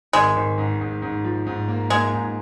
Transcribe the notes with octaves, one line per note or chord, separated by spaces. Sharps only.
G#1 G#3
G#1
G#2
G#2
G#2
F3
G#2
A#3
G#3 A#3
G#2